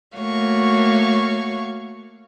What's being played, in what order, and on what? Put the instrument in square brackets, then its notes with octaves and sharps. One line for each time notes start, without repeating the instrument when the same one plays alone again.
[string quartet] A3 A#3 F#4 C#5 F5 C#6